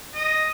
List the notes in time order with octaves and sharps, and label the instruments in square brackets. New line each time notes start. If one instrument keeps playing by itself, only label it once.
[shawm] D#5